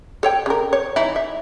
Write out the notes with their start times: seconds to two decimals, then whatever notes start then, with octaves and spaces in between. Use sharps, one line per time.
0.23 A4 C#5 G5
0.46 C#3 A#4
0.73 C#5
0.96 E3 D#4 E4
1.16 E5